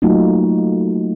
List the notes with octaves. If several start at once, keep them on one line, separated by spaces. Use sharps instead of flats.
F#3 A3 A#3 D#4 F4 F#4